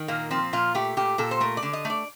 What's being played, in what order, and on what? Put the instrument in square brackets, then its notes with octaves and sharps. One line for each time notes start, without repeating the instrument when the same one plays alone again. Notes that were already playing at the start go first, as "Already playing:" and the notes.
Already playing: [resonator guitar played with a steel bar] D#3
A#2 A#3
F3 C4
A#2 F4
A3 G4
A#2 G4
A#2 A4
C5
A3 A#4
D5
D3
D#5
A3
D5